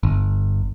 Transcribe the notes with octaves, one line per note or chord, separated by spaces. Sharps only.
G1